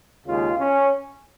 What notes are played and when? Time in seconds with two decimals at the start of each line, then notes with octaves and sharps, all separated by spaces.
0.26 D#2 C#3 G#3 F4
0.59 C#4